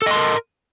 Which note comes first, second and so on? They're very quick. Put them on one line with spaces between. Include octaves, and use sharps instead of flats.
A4 D#5 C6 A#4